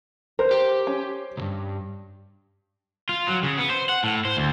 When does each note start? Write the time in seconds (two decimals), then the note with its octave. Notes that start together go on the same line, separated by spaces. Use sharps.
0.39 A#4 C5
0.51 G4
0.87 C#4
1.37 C2 G2
3.09 F4
3.28 F#3
3.43 C#3
3.58 B3
3.70 C5
3.89 F#5
4.03 A2
4.25 C5
4.37 D2